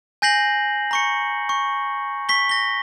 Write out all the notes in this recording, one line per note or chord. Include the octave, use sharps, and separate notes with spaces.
G#5 G6 A#6 C7 F#7
A#5 C#6 C#7
C#6
C#6 B6 G7
A#6 G7